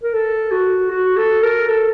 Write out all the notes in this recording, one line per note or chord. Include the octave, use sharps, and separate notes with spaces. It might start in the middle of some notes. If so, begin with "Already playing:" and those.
A#4
A4
F#4
F#4
A4
A#4
A4